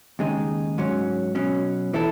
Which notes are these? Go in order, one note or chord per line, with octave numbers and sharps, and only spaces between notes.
D#2 C#3 G#3 D#4
G#2 F#3 C#4
B2 F#3 C#4
E3 B3 E4 A4